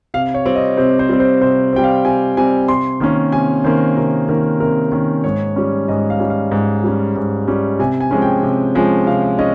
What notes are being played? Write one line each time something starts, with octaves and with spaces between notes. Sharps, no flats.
C3 F5
C#5
G3 C4
D#5
C3 C5
C5
G3 C4
C5
C3 C5
G3 C4 G5
F5
C3 G#5
G3 C4 G#5
C3 C6
D#3 A#3 C#4
C3 G#5
D#3 A#3 C#4 C5
C3 A#4
D#3 A#3 C#4 A#4
C3 A#4
D#3 A#3 C#4
G#2 C#5
G3 C#4
G#2 D#5
F5
G3 C#4
F5
G#2
G3 C#4
G#2
G3 C#4
C3 G#5
G#5
F3 G#3 C#4
G5
C3
F3 G#3 C#4
C3 F5
C#4 D#5